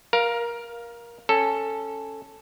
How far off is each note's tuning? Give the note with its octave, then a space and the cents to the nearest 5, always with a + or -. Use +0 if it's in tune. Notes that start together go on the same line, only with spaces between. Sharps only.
A#4 +15 F5 +0
C#4 -5 A4 +5